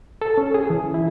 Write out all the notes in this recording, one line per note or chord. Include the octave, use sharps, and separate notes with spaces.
A4
C#4
G#4
E3
E4